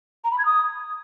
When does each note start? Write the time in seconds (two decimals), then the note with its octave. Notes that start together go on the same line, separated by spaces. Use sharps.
0.24 A#5
0.31 B5
0.38 G#6
0.46 D#6